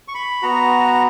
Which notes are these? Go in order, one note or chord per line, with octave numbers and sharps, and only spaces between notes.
C#6
B5
B3 F#4 A#5